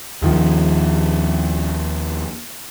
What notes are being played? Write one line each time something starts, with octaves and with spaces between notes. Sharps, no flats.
D#2 D#3 F3